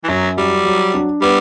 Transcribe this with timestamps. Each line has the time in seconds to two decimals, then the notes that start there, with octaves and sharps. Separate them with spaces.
0.04 E3
0.08 F#2 F#3
0.37 F#3 G3
0.65 F#3
0.94 D4
1.22 G3 B3